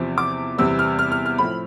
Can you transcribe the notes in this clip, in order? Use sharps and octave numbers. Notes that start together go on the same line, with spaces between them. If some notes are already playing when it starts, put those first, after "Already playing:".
Already playing: E2 C3 F3
D6
E2 C3 G3 B3 E6
F6
F6
F6
F6
A2 F3 C4 B5